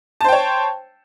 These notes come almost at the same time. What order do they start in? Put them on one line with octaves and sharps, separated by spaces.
A5 C5 G5 C#5